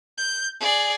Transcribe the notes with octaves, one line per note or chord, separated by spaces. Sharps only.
G6
G#4 D5